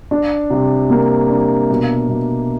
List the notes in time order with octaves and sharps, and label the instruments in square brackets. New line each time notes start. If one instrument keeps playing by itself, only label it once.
[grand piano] D4
C3
A#3
D4
B2
B2